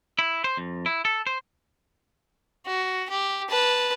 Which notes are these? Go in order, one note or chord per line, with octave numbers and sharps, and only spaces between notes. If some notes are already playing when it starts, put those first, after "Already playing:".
E4
C5
F2
E4
A4
C5
F#4
G4
B4 A5